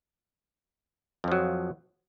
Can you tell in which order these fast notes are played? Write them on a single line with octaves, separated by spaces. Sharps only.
F2 F3 F#3